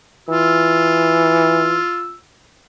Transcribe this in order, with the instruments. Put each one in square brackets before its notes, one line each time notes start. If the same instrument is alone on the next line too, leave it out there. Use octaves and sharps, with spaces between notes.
[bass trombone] E3 [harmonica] F4 E6